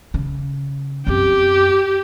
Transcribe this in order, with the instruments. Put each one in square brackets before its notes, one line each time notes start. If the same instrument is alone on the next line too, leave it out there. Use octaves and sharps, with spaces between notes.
[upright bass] C#3
[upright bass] F#2 C4 [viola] G4